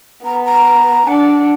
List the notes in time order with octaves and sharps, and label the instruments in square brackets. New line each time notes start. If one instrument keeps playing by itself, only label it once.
[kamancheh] B3 [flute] A#5
[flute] A#5
[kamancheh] D4 [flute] F#5